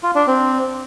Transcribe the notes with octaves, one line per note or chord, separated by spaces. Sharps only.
F4
D4
C4